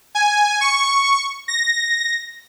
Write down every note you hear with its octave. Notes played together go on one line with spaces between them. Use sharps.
G#5
C#6
A#6